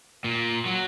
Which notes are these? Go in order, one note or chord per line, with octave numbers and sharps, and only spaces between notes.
A#2
F#3